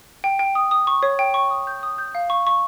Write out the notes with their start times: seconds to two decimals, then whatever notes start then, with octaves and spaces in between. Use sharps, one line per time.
0.24 G5
0.39 G5
0.55 D#6
0.71 D#6
0.87 C#6
1.03 C#5
1.19 G5
1.34 C#6
1.50 D#6
1.67 G6
1.83 D#6
1.98 G6
2.15 F5
2.30 C#6
2.47 C#6